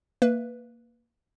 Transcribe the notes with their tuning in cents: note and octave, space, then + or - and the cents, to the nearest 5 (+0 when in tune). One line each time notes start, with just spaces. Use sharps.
A#3 -5 B4 -5 E5 +5